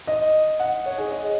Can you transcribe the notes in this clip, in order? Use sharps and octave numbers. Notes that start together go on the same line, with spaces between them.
D#5
F#5
C#5
G#4
D#5